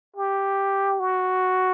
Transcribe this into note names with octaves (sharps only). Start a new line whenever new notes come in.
G4
F#4